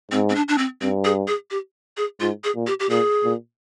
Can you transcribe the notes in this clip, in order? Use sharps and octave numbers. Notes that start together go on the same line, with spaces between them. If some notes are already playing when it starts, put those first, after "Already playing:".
G#2 C4
C4
D4
D4
C4
G2 C4
G#4
G#4
G4
G#4
G#2 F4
G#4
A#2
G4
G4
A#2 G#4
A#2